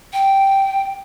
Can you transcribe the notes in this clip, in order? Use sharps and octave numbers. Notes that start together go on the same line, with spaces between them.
G5